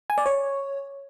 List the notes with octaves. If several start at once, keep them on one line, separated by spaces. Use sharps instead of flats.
G#5
D5
C#5